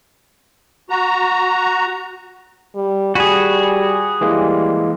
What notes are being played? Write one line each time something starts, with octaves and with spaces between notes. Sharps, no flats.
F#4 A#5
G3
G3 F#4 G#4 G#5 B5
E3 G3 G#3 A#3